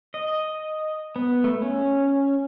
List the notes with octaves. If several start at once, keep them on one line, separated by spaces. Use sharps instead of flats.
D#5
B3
A3
C#4